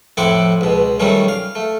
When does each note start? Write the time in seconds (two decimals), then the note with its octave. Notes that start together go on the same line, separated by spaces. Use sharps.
0.17 F2 A2 C4 E4 F#5 D6
0.61 C#2 B2
1.00 D#3 F#3 G3 A3 C#4
1.28 F5
1.55 A3